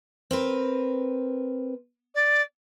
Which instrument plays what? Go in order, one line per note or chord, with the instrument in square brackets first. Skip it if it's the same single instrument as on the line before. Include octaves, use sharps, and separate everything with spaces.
[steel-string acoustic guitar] C4 A#4 B4
[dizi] D5